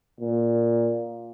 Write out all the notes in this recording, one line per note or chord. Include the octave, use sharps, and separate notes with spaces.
A#2